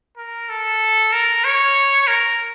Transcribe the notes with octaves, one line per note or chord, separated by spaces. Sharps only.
A#4
A4
A#4
C#5
A#4